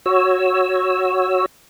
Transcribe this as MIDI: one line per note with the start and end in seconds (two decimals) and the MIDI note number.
0.06 1.46 66
0.06 1.46 73
0.06 1.46 88